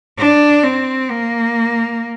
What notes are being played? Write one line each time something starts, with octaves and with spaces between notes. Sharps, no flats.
D4
C4
A#3